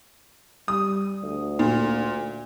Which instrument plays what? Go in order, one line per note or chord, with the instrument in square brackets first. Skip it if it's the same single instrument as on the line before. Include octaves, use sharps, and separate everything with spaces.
[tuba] G3 [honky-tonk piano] D#6
[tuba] D2
[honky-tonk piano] A#2